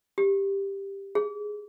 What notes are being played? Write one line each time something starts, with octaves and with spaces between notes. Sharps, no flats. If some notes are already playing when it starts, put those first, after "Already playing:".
G4
G#4